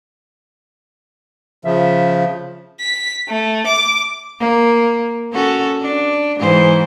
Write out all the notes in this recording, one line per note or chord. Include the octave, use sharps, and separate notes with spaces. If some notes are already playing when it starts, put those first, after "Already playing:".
C#3 F3 E5
B6
A3
D6
A#3
C#4 F#4 A4
D4
G#2 E3 C5